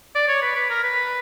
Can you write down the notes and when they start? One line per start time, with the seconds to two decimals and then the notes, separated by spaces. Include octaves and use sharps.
0.15 D5
0.28 C#5
0.42 B4
0.55 B4
0.70 A#4
0.83 B4